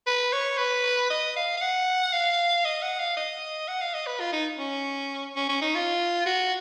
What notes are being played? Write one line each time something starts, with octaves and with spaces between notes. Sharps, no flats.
B4
C#5
B4
D#5
F5
F5
F#5
F5
D#5
F#5
F5
D#5
F#5
F5
D#5
B4
F4
D#4
C#4
C#4
C#4
D#4
F4
F#4